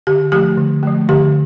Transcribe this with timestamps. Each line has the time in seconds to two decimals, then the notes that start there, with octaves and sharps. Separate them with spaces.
0.07 D3 G4
0.32 F3 A3 G4
0.57 D3
0.83 F3 A3
1.09 D3 G4